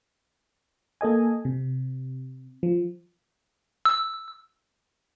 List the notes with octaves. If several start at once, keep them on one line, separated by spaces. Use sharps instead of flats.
A#3 A4 D#5 G#5
C3
F3
E6